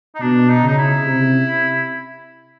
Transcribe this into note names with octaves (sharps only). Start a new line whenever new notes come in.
D#4
B2 D4
D#4
C#3 D#4
E4
C3